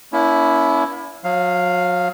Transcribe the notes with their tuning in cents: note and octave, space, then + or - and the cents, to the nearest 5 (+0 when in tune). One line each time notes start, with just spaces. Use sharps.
A#3 +45 C#4 +40 E4 +0
F#3 -35 F5 +0